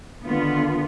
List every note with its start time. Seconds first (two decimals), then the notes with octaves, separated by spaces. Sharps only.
0.24 D3 D#3 B3 F4